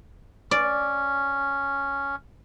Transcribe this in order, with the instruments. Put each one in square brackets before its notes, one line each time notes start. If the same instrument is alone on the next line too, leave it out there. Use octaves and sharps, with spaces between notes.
[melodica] C#4 [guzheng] D5